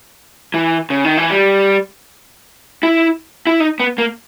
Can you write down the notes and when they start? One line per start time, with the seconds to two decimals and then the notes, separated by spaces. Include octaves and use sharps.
0.54 E3
0.90 C#3
1.05 D#3
1.17 E3
1.30 G3
2.83 E4
3.47 E4
3.60 D#4
3.80 B3
3.98 A#3